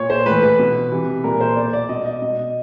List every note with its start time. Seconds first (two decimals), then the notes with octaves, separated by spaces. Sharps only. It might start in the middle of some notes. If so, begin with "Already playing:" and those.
Already playing: A#2 C#5
0.10 C5
0.26 A2 E3 B4
0.43 B4
0.59 B2
0.91 C3 E3
1.24 A#2 A#4
1.40 C5
1.56 B2 D5
1.73 D5
1.89 B2 D#5
2.05 D#5
2.22 B2 D#5